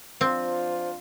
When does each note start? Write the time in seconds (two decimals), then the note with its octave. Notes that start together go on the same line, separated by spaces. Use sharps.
0.21 F3 C4 D4 F4 C5